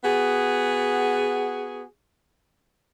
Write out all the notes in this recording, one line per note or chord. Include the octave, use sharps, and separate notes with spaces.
B3 F#4 G#4